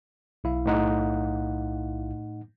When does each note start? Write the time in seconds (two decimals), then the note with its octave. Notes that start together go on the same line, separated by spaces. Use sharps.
0.44 B1 E4 F5
0.66 A2 D#4 F#5